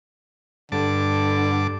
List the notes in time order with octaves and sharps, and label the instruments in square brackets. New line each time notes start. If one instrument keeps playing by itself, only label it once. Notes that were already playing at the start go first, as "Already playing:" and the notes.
[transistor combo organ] G2 A5 D6 [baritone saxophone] D3